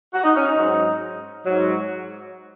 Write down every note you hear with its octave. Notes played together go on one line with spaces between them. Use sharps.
F#4
D#4
C#4
D#4
G#2 F#3
G#2 F#3